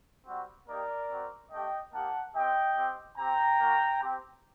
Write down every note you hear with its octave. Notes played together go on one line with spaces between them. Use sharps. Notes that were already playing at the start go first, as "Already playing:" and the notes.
G3 C4 F#4
A#3 D#4 G4 A#4 D5
C4 F#4
A3 D4 G4 D#5 G5
A#3 D#4 G4 F#5 A5
C4 G4 D#5 G5
C4 G4
C4 G4 G5 A#5
A#3 F#4
C4 G4